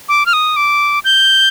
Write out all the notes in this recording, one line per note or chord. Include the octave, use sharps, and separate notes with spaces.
D6
F6
D#6
D6
G6